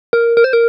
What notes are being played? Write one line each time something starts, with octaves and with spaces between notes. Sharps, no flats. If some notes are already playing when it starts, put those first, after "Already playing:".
A#4
A#4
C5
A#4